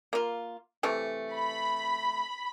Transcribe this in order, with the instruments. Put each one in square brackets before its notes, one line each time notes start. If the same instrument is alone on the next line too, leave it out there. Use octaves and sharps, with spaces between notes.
[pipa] A#3 F4
C3 E3 A3
[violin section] B5